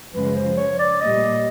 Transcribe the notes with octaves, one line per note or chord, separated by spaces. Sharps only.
F#2 C#3 F3 G#3 B4
C5
C#5
D5
A#2 G3 A#3 D#5